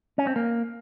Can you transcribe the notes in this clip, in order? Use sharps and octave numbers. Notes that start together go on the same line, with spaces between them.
C#4
C4
A#3